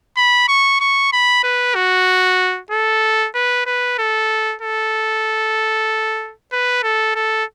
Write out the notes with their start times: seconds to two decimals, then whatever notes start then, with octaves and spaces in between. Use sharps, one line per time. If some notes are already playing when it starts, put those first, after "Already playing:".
0.17 B5
0.48 C#6
0.80 C#6
1.12 B5
1.43 B4
1.75 F#4
2.71 A4
3.34 B4
3.66 B4
3.98 A4
4.62 A4
6.52 B4
6.83 A4
7.15 A4